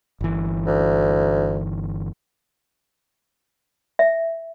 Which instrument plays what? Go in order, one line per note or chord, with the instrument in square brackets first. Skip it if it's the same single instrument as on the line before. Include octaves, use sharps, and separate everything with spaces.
[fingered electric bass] G1 E3
[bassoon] D2
[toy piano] E5